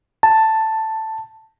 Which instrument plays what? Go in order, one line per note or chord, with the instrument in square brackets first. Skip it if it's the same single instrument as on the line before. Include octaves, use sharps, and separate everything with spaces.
[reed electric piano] A5